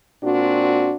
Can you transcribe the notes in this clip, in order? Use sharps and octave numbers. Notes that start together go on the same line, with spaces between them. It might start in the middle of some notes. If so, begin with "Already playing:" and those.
A#2 C4 D4 F#4